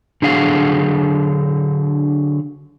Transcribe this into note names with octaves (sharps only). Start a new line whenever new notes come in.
D3 F#3 D4 G#4 F5 F#5